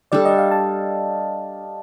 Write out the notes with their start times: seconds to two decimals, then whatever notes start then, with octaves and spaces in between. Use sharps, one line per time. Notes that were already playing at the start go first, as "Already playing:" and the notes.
0.12 G3 D4 A4 D5
0.25 D#5
0.38 F5
0.51 A5